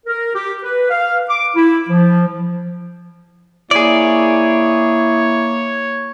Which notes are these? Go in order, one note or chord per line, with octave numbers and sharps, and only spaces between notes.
A#4
G4
B4
F5
D6
E4
F3
A#3 E4 G#4 C#5 D5